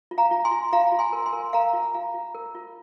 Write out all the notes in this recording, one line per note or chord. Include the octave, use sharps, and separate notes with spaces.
F4
F5 A#5
F4
G#5 C6
F4
F4 F5 A#5
F4
G#5 C6
A#4
G#5 C6
A#4
A#4 F5 A#5
F4
F4 F5 A#5
F4
A#4
F4